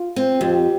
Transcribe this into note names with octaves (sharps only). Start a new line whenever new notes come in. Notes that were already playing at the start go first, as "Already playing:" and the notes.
Already playing: F4
C4
F2 G4